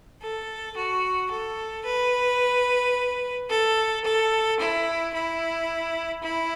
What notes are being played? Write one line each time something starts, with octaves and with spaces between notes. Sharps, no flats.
A4
F#4
A4
B4
A4
A4
E4
E4
E4